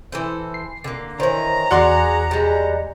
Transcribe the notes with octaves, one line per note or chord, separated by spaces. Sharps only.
E3 A4 C5
C7
D3 A#3
D#3 E3 C5 C#5 A#5
E2 F#4 G#4 D5 C6 F#6 C#7
G3 G#3